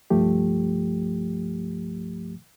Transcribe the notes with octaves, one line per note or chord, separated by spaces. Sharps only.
C2 G2 F3 A3 G4